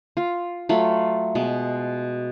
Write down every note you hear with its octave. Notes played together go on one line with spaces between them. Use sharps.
F4
F#3 A3 F4 B5
B2 G#3